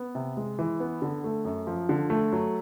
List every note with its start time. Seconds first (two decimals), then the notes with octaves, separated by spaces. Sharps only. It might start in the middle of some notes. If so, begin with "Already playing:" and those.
Already playing: B3
0.15 C3
0.37 G#3
0.59 E3
0.80 B3
1.02 D3
1.24 A3
1.45 F#2
1.67 F3
1.89 D3
2.10 A3
2.33 F#3